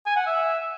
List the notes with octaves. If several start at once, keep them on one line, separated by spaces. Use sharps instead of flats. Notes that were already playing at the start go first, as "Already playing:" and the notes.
G#5
F#5
E5